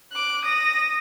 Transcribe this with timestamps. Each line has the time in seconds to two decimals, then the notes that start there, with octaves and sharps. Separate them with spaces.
0.12 D6 F#6
0.44 D#6 A#6